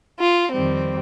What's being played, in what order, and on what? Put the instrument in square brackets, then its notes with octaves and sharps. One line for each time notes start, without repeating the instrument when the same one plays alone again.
[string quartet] F4
F2 D#3 G3 C4